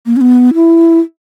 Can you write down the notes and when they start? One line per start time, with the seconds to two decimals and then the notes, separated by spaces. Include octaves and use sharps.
0.06 A#3
0.16 C#4
0.21 B3
0.54 E4